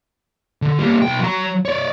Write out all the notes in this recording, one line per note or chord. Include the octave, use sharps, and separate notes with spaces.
D3
G3 A#3
B1 G5
F#3 A#5
C#5 D5